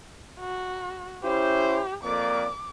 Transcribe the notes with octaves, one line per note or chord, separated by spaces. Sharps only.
F#4
C#4 E4 G4 C5
F2 A#3 D5 D6